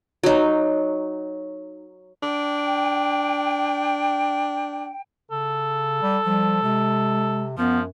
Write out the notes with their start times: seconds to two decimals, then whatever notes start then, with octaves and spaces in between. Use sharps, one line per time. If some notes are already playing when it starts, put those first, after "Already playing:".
0.23 F#3 D#4
2.23 D4 G5
5.31 C#3 A4
6.02 G3
6.25 F3 G3
6.63 C3 G#3
7.58 F#2 F3 B3